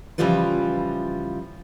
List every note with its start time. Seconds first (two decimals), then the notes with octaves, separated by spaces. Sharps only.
0.18 C#3 E3 F3 G3 F4 B4